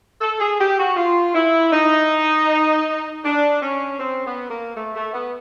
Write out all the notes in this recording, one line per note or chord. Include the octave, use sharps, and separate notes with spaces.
A4
G#4
G4
F#4
F4
E4
D#4
D4
C#4
C4
B3
A#3
A3
A3
B3